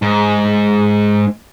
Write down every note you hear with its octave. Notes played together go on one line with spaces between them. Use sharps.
G#2